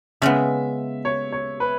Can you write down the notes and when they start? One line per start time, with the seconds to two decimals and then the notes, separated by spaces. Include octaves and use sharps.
0.22 C#3 G#3 B3 E5
1.05 C#5
1.32 C#5
1.60 B4